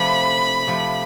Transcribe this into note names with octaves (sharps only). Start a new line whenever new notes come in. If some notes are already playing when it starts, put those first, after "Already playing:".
Already playing: C3 F3 A3 B5
C3 F3 A3